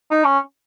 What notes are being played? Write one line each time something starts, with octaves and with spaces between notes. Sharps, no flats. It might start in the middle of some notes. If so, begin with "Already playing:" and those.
D#4
C#4